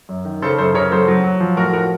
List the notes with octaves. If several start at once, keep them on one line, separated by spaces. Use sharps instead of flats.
F#2
D#3
C#3 A4 C5
F#2 A4 C5
C#3 A#4 C#5
F#3 A4 C5
F#3
F#3
F3
A2 F#4 A#4
F3 F#4 A#4